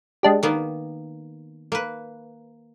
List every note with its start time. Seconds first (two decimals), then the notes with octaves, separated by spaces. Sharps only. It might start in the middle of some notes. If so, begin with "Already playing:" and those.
0.23 G#3 D4 G4
0.43 D#3 A#3 B3
1.72 A#3 B4